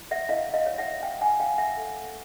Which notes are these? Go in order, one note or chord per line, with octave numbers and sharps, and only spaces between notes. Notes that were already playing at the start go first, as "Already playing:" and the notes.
Already playing: E4
E5 F#5
E4 D#5 F5
D#5 F5
C#5
E5 F#5
C#5 F5 G5
F#5 G#5
F4 F5 G5
E5 F#5
A4